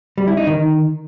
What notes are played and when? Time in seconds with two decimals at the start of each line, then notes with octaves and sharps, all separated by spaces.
0.18 G3
0.27 E4
0.37 D#4
0.47 D#3